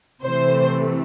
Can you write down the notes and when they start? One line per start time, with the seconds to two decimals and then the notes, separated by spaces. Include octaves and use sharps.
0.23 C3 E3 A3 C5